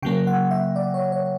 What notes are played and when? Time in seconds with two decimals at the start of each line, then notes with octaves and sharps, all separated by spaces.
0.02 C#3 F#3 A#3 G5
0.27 F#5
0.51 E5
0.76 D5
0.94 C#5
1.12 C#5